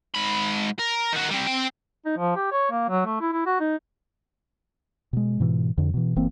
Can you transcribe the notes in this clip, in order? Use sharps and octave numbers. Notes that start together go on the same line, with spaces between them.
G#2 B5
A#4
D#3 F#4
G3 C4
C4 G5
D#4
F3
G4
C#5
A#3
F#3
A3
E4
E4
F#4
D#4
B2 G#3
G#2 B2 E3
F2 D3
B2 E3
F#1 E3 A#3 C4